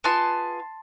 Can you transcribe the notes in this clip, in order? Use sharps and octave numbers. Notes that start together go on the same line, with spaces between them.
B3 F4 G#4 A5 C6